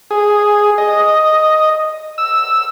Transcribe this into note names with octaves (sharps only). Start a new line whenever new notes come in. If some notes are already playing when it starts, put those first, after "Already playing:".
G#4
D#5
E6